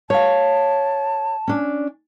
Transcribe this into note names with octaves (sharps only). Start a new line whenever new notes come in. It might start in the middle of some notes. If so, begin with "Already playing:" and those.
C#5 F5 A5
C#4 D4